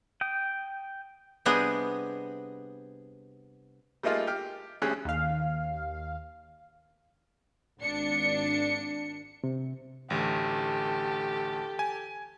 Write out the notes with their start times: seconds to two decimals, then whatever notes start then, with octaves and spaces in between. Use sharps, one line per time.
0.21 G5 D#6
1.45 C3 G3 B3 D4 G#4 D#5
4.03 G3 A3 A#3 D#4 F4 G#4
4.27 G4 F6
4.82 D2 G3 C#4 G#4 F#6
5.05 D#2 F5
7.81 G#1 D4 C#7
9.44 C3
10.10 A1 D2 G4 A4
11.79 G#5